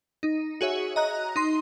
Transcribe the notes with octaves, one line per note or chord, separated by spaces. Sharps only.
D#4
F#4 G#4 C#5 E5
D#5 A#5 F#6
D#4 C6